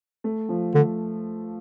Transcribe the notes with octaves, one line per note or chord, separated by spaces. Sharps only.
A3
F3
D3 A3